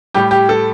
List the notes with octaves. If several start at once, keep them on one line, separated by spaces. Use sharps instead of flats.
A2 G3 G4
G4
A4